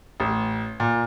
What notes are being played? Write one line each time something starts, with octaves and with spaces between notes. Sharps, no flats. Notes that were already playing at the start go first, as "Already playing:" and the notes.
A1
A#2